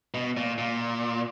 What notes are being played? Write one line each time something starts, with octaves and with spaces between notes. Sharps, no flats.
B2
A#2
A#2